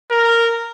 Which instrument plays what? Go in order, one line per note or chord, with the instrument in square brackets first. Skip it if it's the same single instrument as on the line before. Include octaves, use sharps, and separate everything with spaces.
[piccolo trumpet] A#4